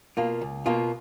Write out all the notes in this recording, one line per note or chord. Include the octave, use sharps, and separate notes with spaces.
B2 A#3 F4
C#2
B2 A#3 F4